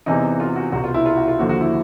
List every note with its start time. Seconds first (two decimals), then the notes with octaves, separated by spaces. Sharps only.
0.06 E2 C3 E3 D#4
0.40 F4
0.56 F#4
0.72 C2 B2 F#4
0.84 F4
0.94 E4
1.06 F4
1.17 F#4
1.28 F4
1.39 D#2 D3 F3 F#4
1.49 F#4
1.61 E4